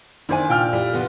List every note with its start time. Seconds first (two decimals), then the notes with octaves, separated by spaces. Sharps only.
0.29 D#3 D4 E4 C5 D5 G#5
0.49 A#2 G5 F6
0.73 G3 E4 A4
0.93 D3 B3 F4